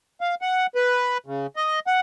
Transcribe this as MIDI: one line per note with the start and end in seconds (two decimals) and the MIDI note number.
0.21 0.35 77
0.42 0.66 78
0.75 1.18 71
1.26 1.47 49
1.56 1.80 75
1.87 2.00 78